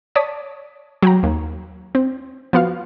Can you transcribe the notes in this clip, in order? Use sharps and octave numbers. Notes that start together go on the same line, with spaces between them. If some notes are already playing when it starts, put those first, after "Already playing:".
C#5 D5 A5 D#6 B6
F#3 G5 A#5
D#2
C4
F3 B3 F#4 F5